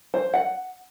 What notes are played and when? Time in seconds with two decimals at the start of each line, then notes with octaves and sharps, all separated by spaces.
0.14 C5
0.34 F#5